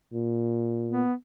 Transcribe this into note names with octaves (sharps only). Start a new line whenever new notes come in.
A#2
B3